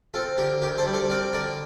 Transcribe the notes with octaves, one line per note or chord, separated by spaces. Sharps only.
C4 F4 A4
D3 G4 A#4
D2 G4 A#4
A4 C5
G3
A4 C5
C4 A#4 D5
D3 A#4 D5